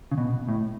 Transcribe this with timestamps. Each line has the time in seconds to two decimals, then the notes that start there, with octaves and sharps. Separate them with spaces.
0.12 C#3
0.18 B2
0.48 A2